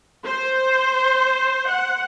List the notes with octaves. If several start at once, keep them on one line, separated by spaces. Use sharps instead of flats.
C5
F#5